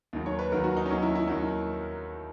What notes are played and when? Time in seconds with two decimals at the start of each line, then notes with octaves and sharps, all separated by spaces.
0.13 D#2 D#3 F#3
0.26 C#5
0.39 B4
0.52 D#2 D#3 F#3 A#4
0.64 F#4
0.77 D#4
0.86 C#4
0.90 D#2 D#3 F#3 D#4
1.02 E4
1.15 E4
1.27 D#2 D#3 F#3 D#4